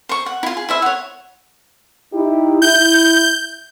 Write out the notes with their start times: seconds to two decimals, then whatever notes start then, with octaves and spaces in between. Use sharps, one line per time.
0.09 C5 C#6
0.26 F#5
0.43 E4 F4
0.57 G#4
0.69 E4 C5 E5
0.82 C#5 F#5
2.13 D#4 E4 G4
2.62 E4 G6